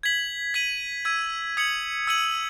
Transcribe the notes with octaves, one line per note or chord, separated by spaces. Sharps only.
G#6 B6 F#7
G#6 B6 D#7 F#7
E6 G#6 D#7
D#6 G#6 C#7 F#7
E6 G#6 D#7 F#7